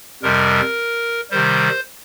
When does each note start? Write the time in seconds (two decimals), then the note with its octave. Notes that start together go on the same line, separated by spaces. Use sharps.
0.22 F2 C3 G3 A#4
1.31 C3 D#3 G3 C5